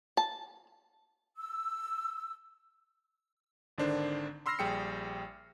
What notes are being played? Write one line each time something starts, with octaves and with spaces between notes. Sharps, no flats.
A5
E6
G#1 D3 D#3 D4 C5
B5 C6 E6 F6 A#6 C7
A#1 G3 G#4 G5 E6 C#7